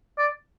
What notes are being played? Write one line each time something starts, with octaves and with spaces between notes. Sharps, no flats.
D5